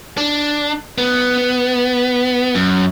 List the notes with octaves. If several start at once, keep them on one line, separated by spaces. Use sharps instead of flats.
D4
B3
F#2